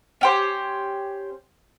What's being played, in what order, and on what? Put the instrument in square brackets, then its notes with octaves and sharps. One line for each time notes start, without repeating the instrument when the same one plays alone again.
[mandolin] C#4 G4 C5